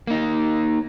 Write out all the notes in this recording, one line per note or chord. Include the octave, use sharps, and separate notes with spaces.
A#3 D#4